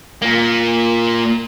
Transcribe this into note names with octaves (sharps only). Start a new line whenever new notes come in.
A#2 A#3